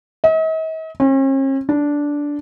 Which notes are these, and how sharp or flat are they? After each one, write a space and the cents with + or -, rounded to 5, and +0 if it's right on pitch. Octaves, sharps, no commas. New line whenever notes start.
D#5 +45
C#4 -45
D4 -10